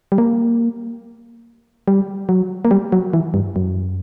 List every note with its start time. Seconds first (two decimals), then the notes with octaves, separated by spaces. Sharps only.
0.12 G3
0.18 A#3
1.88 G3
2.29 F#3
2.65 A#3
2.71 G3
2.92 F#3
3.13 E3
3.34 G2
3.56 F#2